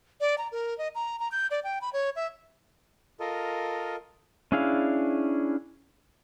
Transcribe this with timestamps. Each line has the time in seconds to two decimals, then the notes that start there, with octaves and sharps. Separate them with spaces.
0.21 D5
0.38 A#5
0.52 A#4
0.78 D#5
0.95 A#5
1.20 A#5
1.32 G6
1.51 D5
1.64 G5
1.81 B5
1.93 C#5
2.16 E5
3.20 F4 A4 A#4 D#5
4.52 C#4 D4 E4 G#4 F5